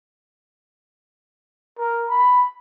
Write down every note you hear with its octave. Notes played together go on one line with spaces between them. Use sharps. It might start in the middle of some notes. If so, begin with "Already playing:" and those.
A#4
B5